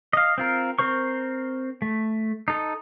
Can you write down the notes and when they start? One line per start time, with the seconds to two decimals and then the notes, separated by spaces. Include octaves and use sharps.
0.13 D#5 F5
0.38 C4 F4 A#4
0.79 C4 A#4 C5 C#6
1.82 A3
2.48 D#4 A4